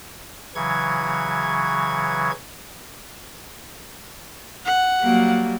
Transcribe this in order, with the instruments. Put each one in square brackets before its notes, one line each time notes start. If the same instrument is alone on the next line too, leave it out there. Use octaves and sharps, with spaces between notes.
[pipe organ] C#3 E3 F#3 C#6 G#6
[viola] F#5
[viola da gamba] F#3 G3 A#3